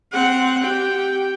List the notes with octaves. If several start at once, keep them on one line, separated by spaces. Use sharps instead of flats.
C4 F#5
G4 G5